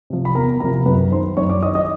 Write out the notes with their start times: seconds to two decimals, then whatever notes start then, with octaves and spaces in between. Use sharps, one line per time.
0.10 C3 F3
0.25 B5
0.35 E2 A#4 A#5
0.60 C3 F3 A#4 A#5
0.86 F#2 B4 B5
1.12 D#3 C5 C6
1.37 F#2 C#5 C#6
1.50 D5 D6
1.62 D#3 D#5 D#6
1.75 D#5 D#6